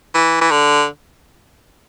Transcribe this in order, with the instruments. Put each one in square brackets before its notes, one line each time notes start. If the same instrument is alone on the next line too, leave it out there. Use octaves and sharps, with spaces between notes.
[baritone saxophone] E3
E3
D3